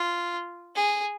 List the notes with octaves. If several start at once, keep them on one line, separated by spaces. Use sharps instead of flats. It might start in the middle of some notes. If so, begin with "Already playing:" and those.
Already playing: F4
G#4